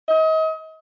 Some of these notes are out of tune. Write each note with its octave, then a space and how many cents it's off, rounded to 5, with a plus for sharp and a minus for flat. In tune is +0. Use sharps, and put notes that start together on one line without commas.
D#5 +35